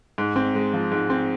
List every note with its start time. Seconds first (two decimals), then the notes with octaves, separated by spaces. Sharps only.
0.18 G#2
0.36 C4
0.55 G#3
0.73 F3
0.92 G#2
1.10 C4